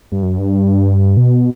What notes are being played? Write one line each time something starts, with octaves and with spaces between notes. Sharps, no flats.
G2
F#2
G2
B2